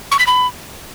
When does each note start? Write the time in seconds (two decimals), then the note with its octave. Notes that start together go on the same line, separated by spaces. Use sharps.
0.12 C#6
0.19 B6
0.27 B5